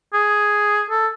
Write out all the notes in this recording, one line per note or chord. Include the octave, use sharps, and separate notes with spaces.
G#4
A4